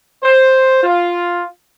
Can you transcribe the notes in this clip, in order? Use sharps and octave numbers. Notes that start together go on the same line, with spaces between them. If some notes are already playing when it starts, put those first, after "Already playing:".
C5
F4